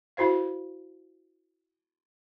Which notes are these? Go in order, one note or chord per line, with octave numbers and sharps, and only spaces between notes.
E4 F#4 C5 F5